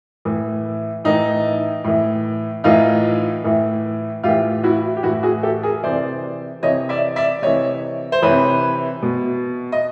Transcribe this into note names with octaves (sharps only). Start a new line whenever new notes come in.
A2 E3
A2 E3 D#4
A2 E3
A2 E3 D#4 F4
A2 E3
A2 E3 F4 G4
E4 F#4
G4
A2 E3 E4 F#4
F#4 G#4
G4 A4
G#4 A#4
C3 E3 C5 D5
C3 E3 C#5 D#5
D5 E5
D5 E5
C3 E3 C#5 D#5
C5
C3 E3 B4 C#5
B2
D#5